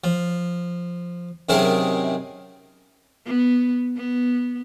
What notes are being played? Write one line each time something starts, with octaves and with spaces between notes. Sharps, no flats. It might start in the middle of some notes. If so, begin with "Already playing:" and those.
F3
F#2 C3 D#3 E4 G#4 A#4
B3
B3